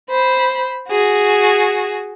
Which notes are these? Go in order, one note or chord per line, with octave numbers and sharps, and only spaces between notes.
C5 B5
F#4 G#4